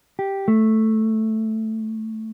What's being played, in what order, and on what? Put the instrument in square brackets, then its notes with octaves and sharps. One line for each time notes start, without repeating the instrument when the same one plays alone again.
[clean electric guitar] G4
A3